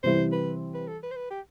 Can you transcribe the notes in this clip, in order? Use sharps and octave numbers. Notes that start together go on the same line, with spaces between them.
C3 E3 G3 C4 E4 C5
B4
B4
A4
B4
C5
B4
G4